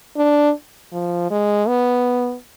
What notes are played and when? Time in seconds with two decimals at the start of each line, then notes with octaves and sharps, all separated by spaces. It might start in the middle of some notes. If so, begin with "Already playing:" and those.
0.17 D4
0.93 F3
1.30 G#3
1.68 B3